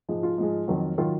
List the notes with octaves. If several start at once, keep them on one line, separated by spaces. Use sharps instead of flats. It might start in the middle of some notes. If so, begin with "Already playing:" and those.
G#2 F3 G#3
F4
G#2 F3 G#3
F2 D#3 F#3
D#3 F#3 F4